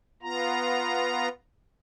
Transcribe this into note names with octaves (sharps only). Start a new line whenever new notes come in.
B3 F4 A#5